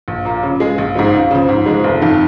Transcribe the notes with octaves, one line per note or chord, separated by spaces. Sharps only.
A#1
A#2 A#3
C#3
G#3 F4 G#4
A#1
G#2 F3 G#3
C#2
C#3 F3
G#2
F3 G#3
F1
F2 D#3